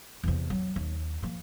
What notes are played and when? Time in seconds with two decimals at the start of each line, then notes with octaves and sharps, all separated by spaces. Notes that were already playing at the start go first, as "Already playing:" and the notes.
0.24 E2 C3
0.50 F#3
0.76 D#2
1.22 F3 A#3